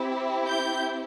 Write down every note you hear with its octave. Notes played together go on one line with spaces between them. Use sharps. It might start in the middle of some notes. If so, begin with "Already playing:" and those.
Already playing: C4 E4 G4
G6